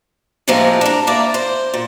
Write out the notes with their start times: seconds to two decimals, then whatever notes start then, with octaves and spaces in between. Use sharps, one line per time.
0.48 A2 C3 F3 G#3 A#3
0.81 D4 A#4
1.07 A#3 E4 A#4 D5
1.34 C5
1.74 A#2